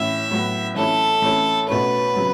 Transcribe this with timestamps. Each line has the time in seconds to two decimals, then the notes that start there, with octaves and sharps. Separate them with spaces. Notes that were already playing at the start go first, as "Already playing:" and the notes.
Already playing: A2 E3 C#4 E4 E5
0.31 A2 F#3 B3
0.76 E3 A3 C#4 E4 A4
1.22 E3 A3 C#4 E4
1.68 B2 A3 C#4 B4
2.14 C#3 F#3 B3